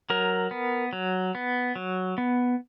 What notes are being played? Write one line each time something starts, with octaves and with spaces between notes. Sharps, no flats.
F#3 A#4
B3
F#3
B3
F#3
B3